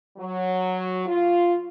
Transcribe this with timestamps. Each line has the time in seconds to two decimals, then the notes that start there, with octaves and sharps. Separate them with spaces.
0.18 F#3
1.06 F4